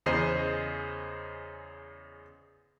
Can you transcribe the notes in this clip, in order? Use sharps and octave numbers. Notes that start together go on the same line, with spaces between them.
E2 C#3 G#4 C5 D#5 C7